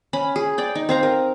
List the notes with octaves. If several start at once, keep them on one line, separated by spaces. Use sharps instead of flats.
C#4 B5
G#4
D5 G5
D#4
C4 F5 A#5
A#4